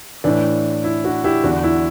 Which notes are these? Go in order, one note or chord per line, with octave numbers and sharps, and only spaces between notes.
A2 E3 D4
E4
D4 F#4
E4 G4
E2 D3 D4 F#4
E4